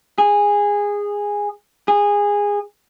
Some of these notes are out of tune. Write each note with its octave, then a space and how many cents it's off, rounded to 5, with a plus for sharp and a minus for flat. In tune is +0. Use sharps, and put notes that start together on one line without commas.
G#4 -15
G#4 -20